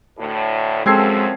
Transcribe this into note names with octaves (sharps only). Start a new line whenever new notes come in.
D2 A2
F#2 F3 G#3 C4 A4 G#6 C7